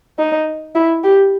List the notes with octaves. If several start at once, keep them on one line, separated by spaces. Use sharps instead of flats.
D#4
E4
G4